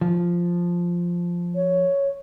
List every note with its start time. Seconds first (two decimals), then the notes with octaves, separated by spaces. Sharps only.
0.01 F3
1.55 C#5